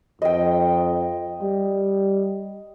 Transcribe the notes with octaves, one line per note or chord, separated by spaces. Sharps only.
F2 D#5 G5
G3